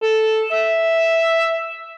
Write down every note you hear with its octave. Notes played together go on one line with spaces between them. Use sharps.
A4
E5